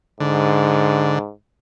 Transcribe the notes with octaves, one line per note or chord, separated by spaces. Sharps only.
G#2 D3